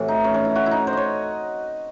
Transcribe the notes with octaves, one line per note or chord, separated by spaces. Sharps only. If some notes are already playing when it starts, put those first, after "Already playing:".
Already playing: A2 C3 E3 F#4
D#4
C#4
C#4
E4
F#4
E4
D#4
C5
C#5 D#5